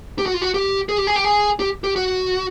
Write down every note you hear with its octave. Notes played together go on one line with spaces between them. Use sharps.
G4
F#4
F4
F#4
G4
G#4
G4
G#4
G4
G#4
G4
G4
F#4